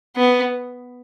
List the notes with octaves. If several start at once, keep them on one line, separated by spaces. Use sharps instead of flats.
B3